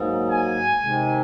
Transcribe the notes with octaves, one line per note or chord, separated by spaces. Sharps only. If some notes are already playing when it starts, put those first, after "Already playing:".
Already playing: G#2 F#3 A#3
G#5
C3 D#3 G#3